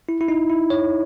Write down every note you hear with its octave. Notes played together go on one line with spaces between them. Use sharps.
E4
E4
D#4
E4
C#5